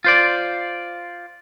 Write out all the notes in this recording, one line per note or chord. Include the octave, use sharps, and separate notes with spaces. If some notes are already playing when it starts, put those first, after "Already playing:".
F4 C5 D5